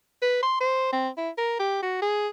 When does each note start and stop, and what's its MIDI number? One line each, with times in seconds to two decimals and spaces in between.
0.22 0.42 71
0.43 0.56 84
0.61 0.90 72
0.93 1.09 60
1.18 1.30 64
1.38 1.55 70
1.59 1.81 67
1.82 2.01 66
2.02 2.28 68